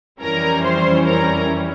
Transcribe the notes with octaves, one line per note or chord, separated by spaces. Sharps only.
F2 E3 G3 C#4 E4 A#4 A#5
C5 C6
A#4 A#5